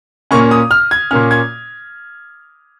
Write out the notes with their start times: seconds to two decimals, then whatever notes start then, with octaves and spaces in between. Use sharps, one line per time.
0.31 A#2 A#3 C#4 C#6
0.51 D#6
0.71 F6
0.91 G#6
1.11 A#2 A#3 C#4 F6
1.31 G#6